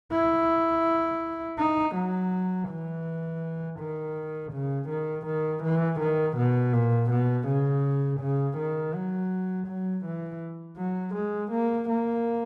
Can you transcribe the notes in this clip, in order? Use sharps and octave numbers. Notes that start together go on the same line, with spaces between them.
E4
D#4
F#3
E3
D#3
C#3
D#3
D#3
E3
D#3
B2
A#2
B2
C#3
C#3
D#3
F#3
F#3
E3
F#3
G#3
A#3
A#3